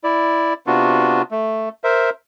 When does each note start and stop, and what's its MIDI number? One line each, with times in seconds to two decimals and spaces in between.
0.04 0.53 64
0.04 0.53 74
0.67 1.22 48
0.67 1.22 59
0.67 1.22 62
0.67 1.22 65
0.67 1.22 66
1.31 1.69 57
1.84 2.10 70
1.84 2.10 72
1.84 2.10 76